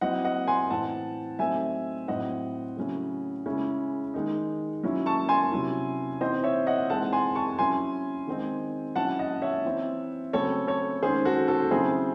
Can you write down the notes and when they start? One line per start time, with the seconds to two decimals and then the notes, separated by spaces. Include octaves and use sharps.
0.01 F#3 C4 E4 D#5 F#5
0.25 D#5 F#5
0.47 G#5 C6
0.70 A2 E3 C4 F#5 A5
1.39 F#3 A3 C4 D#4 E5 G#5
2.08 A2 F#3 C4 E4 D#5 F#5
2.77 C#3 F#3 A3 C#4 E4
3.46 C#3 G#3 C#4 E4
4.14 D#3 G#3 D#4
4.83 F#3 C#4 E4
5.06 A5 C#6
5.29 G#5 C6
5.52 C3 F#3 C#4 E4
6.21 E3 C4 D#4 C5 D#5
6.44 C#5 E5
6.67 D#5 F#5
6.90 E3 G#3 C4 D#4 F#5 A5
7.13 G#5 C6
7.35 A5 C#6
7.59 F#3 C#4 E4 G#5 C6
8.27 D#3 G#3 C4 D#4
8.96 F#3 C#4 E4 F#5 A5
9.19 D#5 F#5
9.42 C#5 E5
9.65 E3 C4 E4
10.33 C#3 F#3 A3 C4 A4 C#5
10.67 A4 C#5
11.03 D#3 G#3 C#4 G#4 C5
11.25 F#4 A4
11.48 F#4 A4
11.71 C#3 F#3 C4 E4 G#4 C5